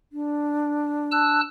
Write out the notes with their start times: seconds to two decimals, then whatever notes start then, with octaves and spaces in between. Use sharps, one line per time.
0.12 D4
1.12 A5 E6 F#6